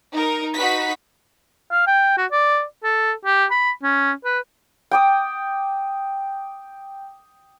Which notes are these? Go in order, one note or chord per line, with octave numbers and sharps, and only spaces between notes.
D#4 A#4
D#4 F#4 B4 B6
F5
G5
F#4
D5
A4
G4
B5
C#4
B4
G5 D6 D#6